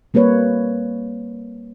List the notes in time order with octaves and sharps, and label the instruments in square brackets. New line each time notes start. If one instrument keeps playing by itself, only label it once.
[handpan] G3 A#3 C4 B4 C#5